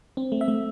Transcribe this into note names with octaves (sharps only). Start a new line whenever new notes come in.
C4
A3
E5
A3